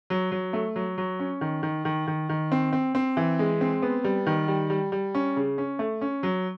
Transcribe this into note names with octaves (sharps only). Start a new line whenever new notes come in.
F#3
F#3
A3
F#3
F#3
C#4
D#3
D#3
D#3
D#3
D#3
C4
C4
C4
E3
G#3
C4
B3
G3
D#3
G3
G3
G3
C#4
C#3
C#4
A3
C#4
F#3